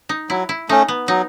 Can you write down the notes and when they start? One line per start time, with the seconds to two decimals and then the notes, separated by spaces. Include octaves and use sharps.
0.09 D#4
0.30 F#3 E4
0.49 E4
0.69 A3 C#4 D#4
0.88 B3
1.08 F#3 D#4